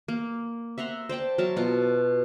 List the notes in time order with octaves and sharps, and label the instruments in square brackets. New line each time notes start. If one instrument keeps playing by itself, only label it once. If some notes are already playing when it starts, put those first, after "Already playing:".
[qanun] A#3
E5 F#5 A#5 C6
C5 D5 G5 A5
F#3 A#4 E5 A5
B2 F4